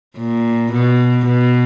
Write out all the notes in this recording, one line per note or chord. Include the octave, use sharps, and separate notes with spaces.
A#2
B2
B2